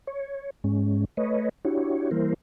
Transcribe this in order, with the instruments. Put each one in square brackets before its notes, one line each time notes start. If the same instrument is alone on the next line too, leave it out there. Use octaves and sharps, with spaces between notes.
[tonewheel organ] C#5
G#2 G#3 C#4
A3 B4 C#5 D#5
D4 E4 F#4 G4 C#5
E3 G3 A#3 E4 A#4 C5